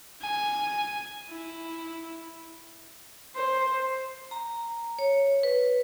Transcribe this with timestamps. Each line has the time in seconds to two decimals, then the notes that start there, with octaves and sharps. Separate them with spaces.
0.22 G#5
1.30 E4
3.35 C5
4.31 A#5
4.99 C#5
5.43 B4